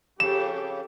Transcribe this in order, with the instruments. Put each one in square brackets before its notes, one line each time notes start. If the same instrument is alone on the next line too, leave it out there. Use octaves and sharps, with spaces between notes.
[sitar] F2 C#3 [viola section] G4 A4 [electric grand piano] E7